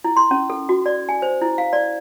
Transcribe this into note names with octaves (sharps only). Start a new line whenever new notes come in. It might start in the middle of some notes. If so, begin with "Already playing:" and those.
E4
C6
C#4
A4
F#4
D5
G#5
C5
E4
F5
D5